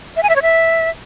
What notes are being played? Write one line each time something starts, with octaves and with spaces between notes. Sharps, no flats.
E5
G#5
E5
C#5
E5